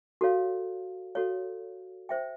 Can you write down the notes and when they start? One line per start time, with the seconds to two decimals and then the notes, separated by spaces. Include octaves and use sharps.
0.21 F#4 A4 C#5 F5
1.15 F#4 A4 C#5 F5
2.09 C5 E5 G5